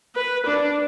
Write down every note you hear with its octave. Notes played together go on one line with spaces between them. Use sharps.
B4
D4